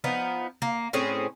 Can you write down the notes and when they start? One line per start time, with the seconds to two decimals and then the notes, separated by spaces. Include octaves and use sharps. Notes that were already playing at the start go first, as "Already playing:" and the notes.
0.04 F3 B3 D#4
0.62 A#3
0.93 A2 C4 C#4 G#4